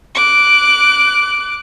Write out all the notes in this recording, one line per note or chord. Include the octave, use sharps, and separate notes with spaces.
D6 F#6